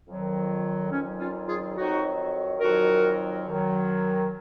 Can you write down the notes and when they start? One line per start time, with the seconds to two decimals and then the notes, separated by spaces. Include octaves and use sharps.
0.07 F2 D#3 F#3
0.90 F2 D#3 F#3 C#4
1.19 C#4 F4
1.47 F4 G#4
1.75 F2 D#3 F#3 D#4 F#4
2.59 F2 D#3 F#3 F#4 A#4
3.45 F#2 D#3 F#3